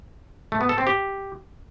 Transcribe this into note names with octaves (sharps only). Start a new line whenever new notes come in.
A3
B3
A4
C4
G4